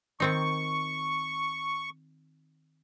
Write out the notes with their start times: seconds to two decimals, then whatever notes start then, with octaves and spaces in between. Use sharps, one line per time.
0.20 D#3 C4 D#4 C#6